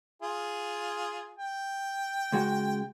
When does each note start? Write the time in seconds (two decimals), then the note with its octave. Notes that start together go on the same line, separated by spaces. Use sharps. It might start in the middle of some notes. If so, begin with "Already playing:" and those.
0.22 F4 G#4
1.39 G5
2.32 C#2 G#3 F#4